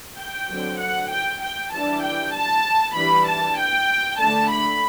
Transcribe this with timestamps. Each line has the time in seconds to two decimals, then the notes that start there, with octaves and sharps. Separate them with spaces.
0.18 G5
0.49 D3 F#3 C4
0.79 F#5
1.11 G5
1.41 G5
1.72 E3 G3 D4 A5
2.03 G5
2.33 A5
2.95 E3 G3 D4 B5
3.27 A5
3.58 G5
4.19 D3 A3 D4 A5
4.50 B5